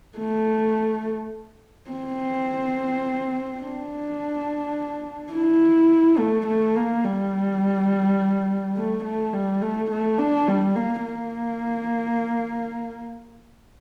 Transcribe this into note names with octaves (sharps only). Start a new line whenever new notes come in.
A3
C4
D4
E4
A3
A3
A#3
G3
A3
A3
G3
A3
A3
D4
G3
A#3
A#3